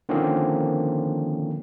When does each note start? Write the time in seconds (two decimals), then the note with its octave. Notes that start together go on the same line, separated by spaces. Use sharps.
0.09 D3 D#3 F3 A#3 C4 C#4